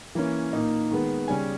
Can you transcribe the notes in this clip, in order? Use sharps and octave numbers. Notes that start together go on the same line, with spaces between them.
E3 A#3 C#4
A#2 A#3 D#4
D#3 G#3 B3
C#3 G3 C#4 G#5